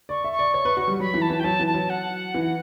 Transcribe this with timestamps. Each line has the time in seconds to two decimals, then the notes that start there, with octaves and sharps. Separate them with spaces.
0.09 D5 C#6
0.24 E5
0.32 C#6
0.39 D5
0.54 C#5
0.65 B4
0.77 F#4
0.87 G3
1.00 F#3 B5
1.14 E3
1.21 A5
1.30 E3
1.39 G5
1.44 F#3 A5
1.60 E3
1.67 A5
1.74 F#3
1.89 F#5
2.34 E3